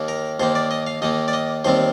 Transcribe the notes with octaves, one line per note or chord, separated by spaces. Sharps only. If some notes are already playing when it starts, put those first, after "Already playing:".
Already playing: D#2 D#3 A#3
A#4
D#2 D#3 A#3 C5
D5
D#5
F5
D#2 D#3 A#3 D#5
D5
D#5
D#2 D#3 G3 C4 C5